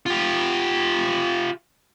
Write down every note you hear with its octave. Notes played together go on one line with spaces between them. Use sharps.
F4 G4